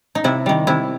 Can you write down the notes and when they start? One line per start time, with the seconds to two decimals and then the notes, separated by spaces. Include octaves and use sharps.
0.15 D#4
0.24 C3 E4
0.46 D#3 G3
0.67 C3 E4